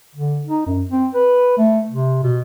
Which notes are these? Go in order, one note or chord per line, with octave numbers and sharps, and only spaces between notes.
D3
D#4
F#2
C4
B4
A3
C3
B2